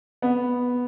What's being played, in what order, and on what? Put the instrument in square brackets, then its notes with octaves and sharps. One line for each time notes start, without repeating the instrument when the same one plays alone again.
[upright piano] B3